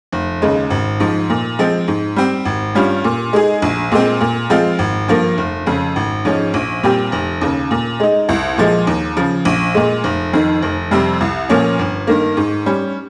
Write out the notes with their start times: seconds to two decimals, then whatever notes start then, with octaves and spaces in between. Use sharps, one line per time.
0.12 F1
0.42 D#2 C#3 G#3
0.70 G#1
1.00 G#2 F3
1.30 A#2
1.59 F3 G#3 C4
1.88 G#2
2.16 G3 C4
2.45 G#1
2.75 G2 G3 C#4 F4
3.04 A#2
3.33 G#3 D#4 G#4
3.62 A#1
3.92 A#2 G#3 C4
4.21 A#2
4.50 F3 G#3 C4 F4
4.79 G#1
5.08 G2 F3 A#3
5.38 F1
5.66 F2 C#3
5.96 G#1
6.25 G#2 F3 G#3 C#4
6.54 A#1
6.83 A#2 G3 C4 G4
7.12 F1
7.41 D#2 C#3
7.71 A#2
8.00 G#3 D#4
8.29 C2
8.58 A#2 F3 G#3
8.87 D#2
9.17 C#3 F3
9.45 A#1
9.74 A#2 G#3
10.04 F1
10.33 F2 D#3
10.62 F1
10.91 F2 C3 G3 C4
11.21 C2
11.49 A#2 F3 A#3 C#4
11.79 G1
12.07 G2 D#3 A#3
12.37 G#2
12.66 G3 C#4